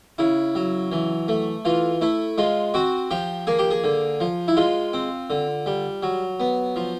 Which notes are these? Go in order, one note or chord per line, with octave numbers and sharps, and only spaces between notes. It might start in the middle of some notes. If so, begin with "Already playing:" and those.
C#3 E4
F#3
E3
A3
E3 F4
A3 E4
G#3 F4
C4 F#4
F3 G4
A#3 G#4
G4
G#4
D3
F3
E4
G#3 F4
C4
D3
G3
F#3
B3
F3